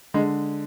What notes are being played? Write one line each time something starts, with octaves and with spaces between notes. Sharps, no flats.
D3 G#3